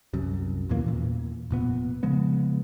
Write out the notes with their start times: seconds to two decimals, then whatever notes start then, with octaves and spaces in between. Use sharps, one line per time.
0.14 C2 F#2
0.69 D#2 A#2 E3 A#3
0.86 E2 A#2
1.51 F1 A#2 B3
2.03 C#3 F3 G#3 B3